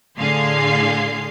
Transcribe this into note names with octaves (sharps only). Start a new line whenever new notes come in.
A2 D3 G#4 F5 C6 C7